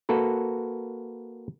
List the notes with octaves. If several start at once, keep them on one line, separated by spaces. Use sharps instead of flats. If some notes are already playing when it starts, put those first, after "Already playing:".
A#3 F#4 A4 B4